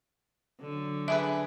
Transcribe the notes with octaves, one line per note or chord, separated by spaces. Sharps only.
D3 F#3
D4 G#4 B4 E5